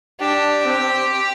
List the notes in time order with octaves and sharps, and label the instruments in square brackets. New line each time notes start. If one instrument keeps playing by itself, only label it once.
[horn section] D4 [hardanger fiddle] G4
[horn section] C4